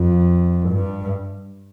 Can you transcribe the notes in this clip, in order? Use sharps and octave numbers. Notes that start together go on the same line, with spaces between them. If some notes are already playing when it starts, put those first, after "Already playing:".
Already playing: F2
G2